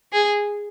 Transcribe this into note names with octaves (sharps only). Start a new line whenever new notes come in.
G#4